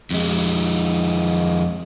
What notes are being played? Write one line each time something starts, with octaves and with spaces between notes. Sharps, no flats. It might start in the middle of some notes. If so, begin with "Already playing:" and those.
F2 G#3